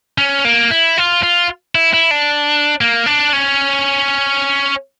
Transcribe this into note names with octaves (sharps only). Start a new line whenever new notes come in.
C#4
A#3
E4
F4
F4
E4
E4
D4
A#3
D4
C#4